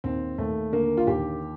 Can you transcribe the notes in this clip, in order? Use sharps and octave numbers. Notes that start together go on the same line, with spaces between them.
D#2 C4
D#2 A3
D3 A#3
F4
D#2 G4